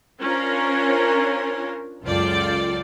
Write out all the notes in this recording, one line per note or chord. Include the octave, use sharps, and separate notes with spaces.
C#4 D4 F4 A#4 C5
C#2 F#2 F4 A4 D5 G5